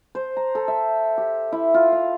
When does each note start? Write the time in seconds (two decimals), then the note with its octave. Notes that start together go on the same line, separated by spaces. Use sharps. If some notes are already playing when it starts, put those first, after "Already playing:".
0.15 C5
0.37 A#5
0.55 A4
0.68 E5
1.18 G4
1.52 E4
1.74 F4
1.92 F5